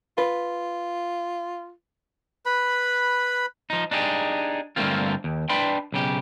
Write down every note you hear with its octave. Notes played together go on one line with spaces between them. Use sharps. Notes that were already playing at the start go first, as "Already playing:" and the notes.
F4 B4
B4 B5
F3 D#4
D4 D#4 G4 G#4
G2 D3 A3 A#3 C4 F4
D#2
D4 B4 D5 G5 B5 C6
B1 C#3 G4